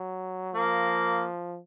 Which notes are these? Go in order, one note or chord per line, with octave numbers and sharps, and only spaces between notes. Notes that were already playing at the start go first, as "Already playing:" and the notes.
Already playing: F#3
F3 A#3